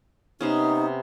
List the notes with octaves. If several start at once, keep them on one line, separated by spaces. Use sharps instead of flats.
C3 B3 C#4 D#4